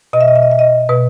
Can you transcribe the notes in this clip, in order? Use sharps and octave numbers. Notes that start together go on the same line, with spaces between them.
B2 D#5
E5
D#5
E5
D#5
E5
D#5
B2 B4